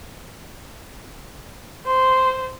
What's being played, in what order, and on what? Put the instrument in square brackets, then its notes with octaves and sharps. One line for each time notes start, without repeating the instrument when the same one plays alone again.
[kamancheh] C5 [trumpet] C6